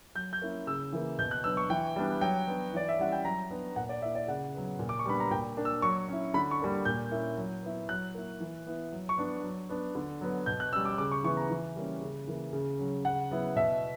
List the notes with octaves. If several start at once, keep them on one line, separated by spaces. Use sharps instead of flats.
F#3 G6
G6
A#3 C#4 E4
C#3 E6
E3 A#3
B2 G6
F#6
F#3 B3 D4 E6
C#6
E3 G5
G3 B3 D4
F#3 G5
B3 D4
E3 D5
E5
G3 C#4 E4 F#5
G5
F#3 A#5
B3 D4
A#2 F#5
D5
A#3 E4 E5
D5
C#3 F#5
F#3 B3
A#2
D6
C#6
G3 B3 D4 B5
A#5
A#2 G5
A#3 D4
E6
F#3 C#6
C#4 E4
D3 B5
C#6
G3 A#3 D4
A#2 G6
A#3 C#4 E4
F#3
B3 E4
F#3 F#6
A#3 E4
E3
B3 E4
F#3
C#6
B3 D4
F#3
B3 D4
D3
F#3 B3
B2 G6
F#6
G3 C#4 E6
D6
C#3 D6
C#6
E3 B3 C#6
A#5
E3
G3 A#3 C#4
C#3
E3 A#3
C#3
F#3 C#4
C#3 F#5
F#3 B3 E4
B2 E5